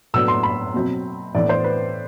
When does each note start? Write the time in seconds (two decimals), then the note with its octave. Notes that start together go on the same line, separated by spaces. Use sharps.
0.14 A2 F#3 B3 D4 E6
0.28 C6
0.43 B5
0.74 B2 F#3 C4
1.34 A2 E3 B3 D4 D5
1.49 C5
1.64 B4